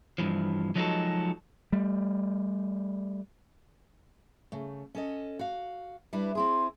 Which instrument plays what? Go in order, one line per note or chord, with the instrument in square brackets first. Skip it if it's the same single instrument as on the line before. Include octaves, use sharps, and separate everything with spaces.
[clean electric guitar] G2 E3 F3
F3 F#3 G#3 D#4 F#4 A4
[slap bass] G3 A3
[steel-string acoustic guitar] C#3 A3
C#4 A4 D#5
F#4 F5
[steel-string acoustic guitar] G3 D4 E4 [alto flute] B4
[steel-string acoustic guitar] C4 E4 G#4 [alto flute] C6